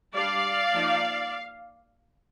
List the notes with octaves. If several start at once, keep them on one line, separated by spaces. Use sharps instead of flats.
G3 D4 D5 F5
F3 A#3 D#4